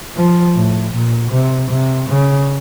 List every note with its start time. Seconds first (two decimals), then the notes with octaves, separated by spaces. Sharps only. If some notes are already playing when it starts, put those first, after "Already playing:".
0.16 F3
0.56 A2
0.94 A#2
1.31 C3
1.70 C3
2.09 C#3